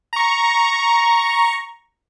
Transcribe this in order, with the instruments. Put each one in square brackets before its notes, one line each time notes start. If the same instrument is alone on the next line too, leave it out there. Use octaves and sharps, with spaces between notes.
[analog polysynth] A#5 C#6